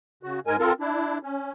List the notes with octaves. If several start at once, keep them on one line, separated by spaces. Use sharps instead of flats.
C#3 F#4
G#2 G#3 A#4 G#5
C4 F4 A4 A#4
D4 E4
C#4